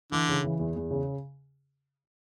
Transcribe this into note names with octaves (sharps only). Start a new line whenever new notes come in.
D3 E3
C#3
E3
E2
E2
C#3